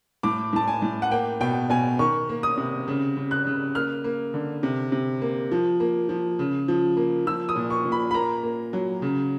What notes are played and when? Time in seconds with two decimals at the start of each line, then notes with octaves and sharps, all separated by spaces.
0.23 A2 D6
0.53 A2 A5
0.68 G#5
0.82 A2
1.02 F#5
1.11 A#3 G5
1.41 B2 G5
1.70 B2 G#5
1.99 D#3 C#6
2.29 A#3
2.43 D#6
2.57 C3
2.88 C#3
3.17 C#3
3.31 F#6
3.46 C#3
3.75 A#3 F6
4.04 A#3
4.34 D3
4.63 C3
4.92 C3
5.22 A#3
5.52 F3
5.80 A#3
6.09 F3
6.39 C#3
6.68 F3
6.97 A#3
7.27 F3 E6
7.49 D#6
7.56 A#2
7.70 C#6
7.85 A#2
7.92 B5
8.11 B5
8.14 A#3 A#5
8.43 A#3
8.73 F#3
9.02 C#3